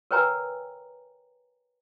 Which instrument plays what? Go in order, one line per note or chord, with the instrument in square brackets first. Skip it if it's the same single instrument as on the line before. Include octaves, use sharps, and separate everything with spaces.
[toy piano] A#4 B4 C#5 G5 G#5 A#5